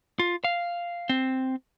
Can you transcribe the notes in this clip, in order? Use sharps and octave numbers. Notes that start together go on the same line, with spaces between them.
F4
F5
C4